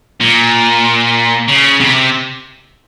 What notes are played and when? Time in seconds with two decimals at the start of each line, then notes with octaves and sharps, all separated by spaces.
0.20 A#2
1.48 C#3
1.80 C3